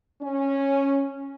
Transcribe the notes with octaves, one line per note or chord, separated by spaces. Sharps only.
C#4